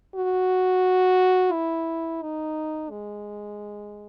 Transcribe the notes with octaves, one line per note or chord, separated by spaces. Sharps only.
F#4
E4
D#4
G#3